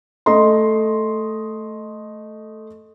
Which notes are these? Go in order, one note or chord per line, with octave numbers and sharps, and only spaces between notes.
A3 D#5 C6